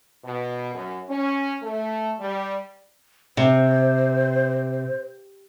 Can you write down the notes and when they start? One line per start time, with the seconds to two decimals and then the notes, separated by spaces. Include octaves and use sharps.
0.24 B2
0.74 F#2
1.10 C#4
1.63 A3
2.20 G3
3.37 C3 C5